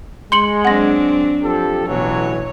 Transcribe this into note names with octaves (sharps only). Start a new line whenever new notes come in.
G#3 C6 C#7 F#7
F#3 C4 D4 F#5 A#6
F3 G4 A4
A1 B2 E3 F#3 C#5